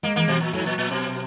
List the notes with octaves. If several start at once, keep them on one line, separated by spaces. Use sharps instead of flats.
G#3 A#3
E3 A#3
B2 F#3
A#2
G#2 F#3
A#2
A#2
B2